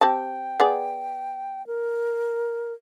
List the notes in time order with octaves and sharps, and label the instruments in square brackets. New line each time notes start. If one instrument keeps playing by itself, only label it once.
[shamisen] C4 G4 A5 [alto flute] G5
[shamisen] B3 G#4 D5
[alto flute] A#4